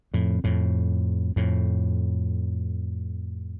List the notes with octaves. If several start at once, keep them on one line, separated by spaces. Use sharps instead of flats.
F2 A2
F2 A2
F2 A2